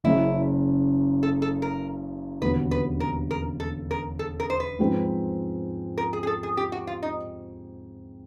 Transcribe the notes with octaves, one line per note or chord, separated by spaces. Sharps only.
F#1 F#2 C#3 E4
A4
A4
A#4
E1 D#2 D3 F#3 B3 B4
B4
A#4
A#4
A4
A#4
A4
A#4
C5
B4
G#2 F3 G#3 C4
A#4
G#4
G#4
A4
G#4
G4
F#4
F4
D#4